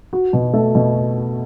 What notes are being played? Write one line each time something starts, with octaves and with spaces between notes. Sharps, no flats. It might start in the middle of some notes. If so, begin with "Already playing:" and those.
F#4
B2
A3
B2